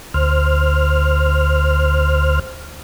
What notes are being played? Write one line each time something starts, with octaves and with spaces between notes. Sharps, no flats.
D2 C5 F6